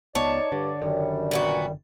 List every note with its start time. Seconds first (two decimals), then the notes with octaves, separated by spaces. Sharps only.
0.15 C#2 B3 D#4 C#5 D5 A5
0.52 G2 D3
0.82 F#1 F#2 D3 D#3 G3 D4
1.31 A#2 B3 F#4